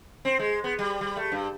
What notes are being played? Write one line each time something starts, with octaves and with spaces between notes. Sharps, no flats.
C4
G#3
B3
G3
G3
A3
G2